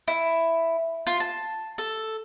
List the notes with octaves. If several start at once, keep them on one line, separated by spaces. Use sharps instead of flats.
E4
F4
A5
A4